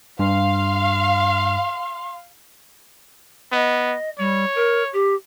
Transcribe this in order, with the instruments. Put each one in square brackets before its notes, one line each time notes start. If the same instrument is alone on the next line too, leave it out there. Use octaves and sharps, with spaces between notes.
[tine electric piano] G2 [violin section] F5 [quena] C6
[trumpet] B3 [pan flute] D#5
[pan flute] G3 [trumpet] C#5
[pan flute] A#4
G4